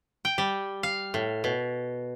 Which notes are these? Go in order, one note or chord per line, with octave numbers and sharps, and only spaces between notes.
G5
G3
F5
A2
B2